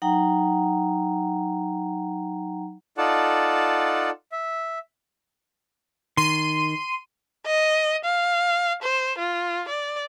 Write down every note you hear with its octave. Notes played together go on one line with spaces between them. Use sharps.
F#3 D#4 F#5 G5 A#5
D#4 F4 A4 D5 F#5 A5
E5
D#3 C6 D#7
D#5
F5
C5
F4
D5